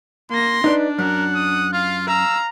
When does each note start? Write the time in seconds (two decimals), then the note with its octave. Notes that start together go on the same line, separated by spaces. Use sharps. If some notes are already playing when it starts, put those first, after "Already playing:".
0.31 A#3 C6 A#6
0.64 D4 D#4 B4 D5
0.99 F#2 A#4 F#5
1.34 D#6
1.73 F4 F5
2.07 F5 A#5 E6